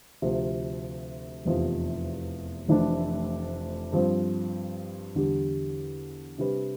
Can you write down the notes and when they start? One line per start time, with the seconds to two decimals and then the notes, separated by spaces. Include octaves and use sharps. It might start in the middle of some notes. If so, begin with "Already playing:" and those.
0.22 D2 C3 F3 C4
1.45 F1 E2 C3 F3 C4
2.68 F1 F2 E3 A3 D4
3.92 G2 F3 C4
5.15 E2 D3 G3
6.38 C3 G3 D4 G4 B4